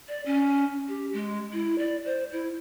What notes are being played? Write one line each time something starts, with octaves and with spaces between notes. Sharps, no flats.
D5
C#4
G4
G#3
E4
D5
C5
E4